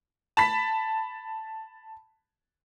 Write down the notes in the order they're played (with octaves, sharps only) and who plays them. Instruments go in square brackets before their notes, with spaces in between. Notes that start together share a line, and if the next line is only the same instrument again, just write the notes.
[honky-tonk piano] A5 B5 B6